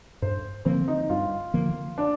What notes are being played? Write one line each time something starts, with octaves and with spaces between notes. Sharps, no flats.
G2 C5
D3 F3 A#3 C4
D#4
G2 F4
D3 F3 A#3
D4